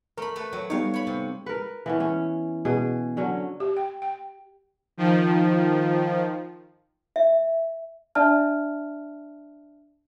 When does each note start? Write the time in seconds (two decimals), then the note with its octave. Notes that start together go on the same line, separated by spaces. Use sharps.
0.17 A3 A#4 B5
0.36 A3 B4
0.53 F#3
0.70 G3 B3 D#4 C#5 F5
0.94 C#5 B5
1.07 C3
1.46 A#4 B4
1.86 E3 B3 C#4
2.00 C#4
2.65 B2 G#4
3.17 D3 F#3 C#4
3.60 G4
3.77 G5
4.02 G5
4.97 D#3 F3
7.16 E5
8.15 D4 D5 E5 A5 F6